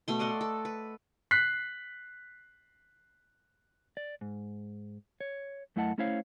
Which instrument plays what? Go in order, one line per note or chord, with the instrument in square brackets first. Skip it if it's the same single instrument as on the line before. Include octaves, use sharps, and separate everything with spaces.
[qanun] B2 A3 C6
D5 D#5 F#5 C6
A4
B4
[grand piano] F#6 B6 C7
[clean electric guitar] D5
G#2
C#5
F#2 A3 E4 D#5 F#5 A5
A3 C#4 E4 C5 C#5 F5